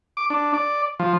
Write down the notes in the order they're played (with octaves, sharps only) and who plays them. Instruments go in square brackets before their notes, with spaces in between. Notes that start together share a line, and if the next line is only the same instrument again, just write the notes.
[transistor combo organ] D6
D4
D5
F3